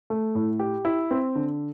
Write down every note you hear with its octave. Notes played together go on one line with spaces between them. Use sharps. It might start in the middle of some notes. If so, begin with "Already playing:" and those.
A3
A2
G4
E4
C4
D3